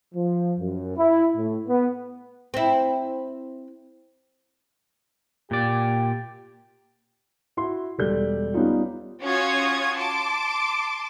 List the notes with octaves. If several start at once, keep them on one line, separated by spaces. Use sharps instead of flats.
F3
F#2
E4
A2
B3
C4 E4
A#2 G4 D5
E4 F#4 C6
E1 G3 A4 G6
G3 B3 C#4 D#4 F4
C#4 F4 F#4 C#6 D#6 G#6
A5 C6 D6